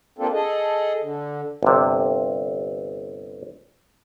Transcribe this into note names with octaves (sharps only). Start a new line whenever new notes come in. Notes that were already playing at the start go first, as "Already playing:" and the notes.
A#3 C4 D4 F4 G4 A4
G#4 A4 D#5
D3
G1 C3